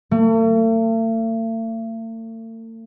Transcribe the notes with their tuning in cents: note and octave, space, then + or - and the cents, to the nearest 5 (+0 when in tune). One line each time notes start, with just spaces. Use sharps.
A3 +45